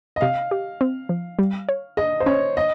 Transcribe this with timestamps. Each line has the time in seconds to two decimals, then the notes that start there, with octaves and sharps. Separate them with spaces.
0.16 D#5
0.21 C3 F5
0.51 G4
0.81 C4
1.09 F3
1.39 G3
1.69 C#5
1.97 G#4 D#5
2.20 C5
2.26 C#4 C#5
2.57 D#5